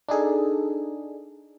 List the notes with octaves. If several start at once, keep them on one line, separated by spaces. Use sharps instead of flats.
D4 D#4 G#4 A4